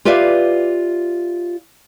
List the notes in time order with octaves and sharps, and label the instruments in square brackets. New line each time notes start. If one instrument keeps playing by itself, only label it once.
[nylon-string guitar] F4 G4 B4 D5 E5 F5